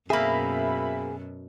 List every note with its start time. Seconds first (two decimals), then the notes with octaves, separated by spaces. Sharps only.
0.10 F#2 B2 A#3 C4 G#4 E5 B5